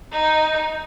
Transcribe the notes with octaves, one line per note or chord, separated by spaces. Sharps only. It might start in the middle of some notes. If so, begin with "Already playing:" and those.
D#4